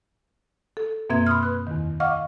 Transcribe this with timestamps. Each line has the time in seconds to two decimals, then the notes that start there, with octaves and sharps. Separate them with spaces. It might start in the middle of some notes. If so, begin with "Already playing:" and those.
0.77 A4
1.10 F#2 B2 A#3 C4 E5 G#6
1.27 B5 C6 D#6 F6
1.43 B4 F#6
1.67 E2 D#3
2.00 D#5 F5 F#5 C#6 D6 F6